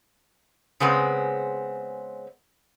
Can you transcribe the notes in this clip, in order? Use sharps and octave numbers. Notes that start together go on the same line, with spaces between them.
C#3 G#3 B3 C4